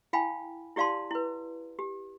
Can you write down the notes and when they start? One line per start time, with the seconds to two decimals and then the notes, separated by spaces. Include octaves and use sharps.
0.13 E4 F5 G5 G#5 B5
0.76 E4 G4 D5 F5 A5 C6
1.11 E4 B4
1.79 G4